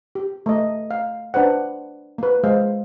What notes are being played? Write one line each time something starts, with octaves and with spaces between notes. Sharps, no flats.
G4
A3 D#5
F5
D4 B4 C5 F#5
A#3 B4
G#3 A#3 C5 F5